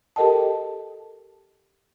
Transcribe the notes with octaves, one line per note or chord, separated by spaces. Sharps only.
G4 A4 A#4 D#5 G5 A5